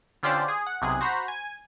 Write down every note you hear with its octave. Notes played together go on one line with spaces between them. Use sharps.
D3 C#4 F4 G4 C5 D5
G#4
F#5
B1 C3 G#4 F#6
F#4 C5 A#5 B5
G#5